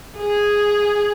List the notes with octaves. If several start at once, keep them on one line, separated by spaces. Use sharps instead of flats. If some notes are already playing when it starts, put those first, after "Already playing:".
G#4